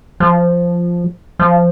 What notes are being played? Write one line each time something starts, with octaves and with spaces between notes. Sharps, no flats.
F3
F3